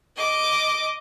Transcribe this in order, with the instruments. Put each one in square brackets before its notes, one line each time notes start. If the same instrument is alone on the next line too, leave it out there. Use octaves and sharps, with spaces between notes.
[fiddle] D#5 D6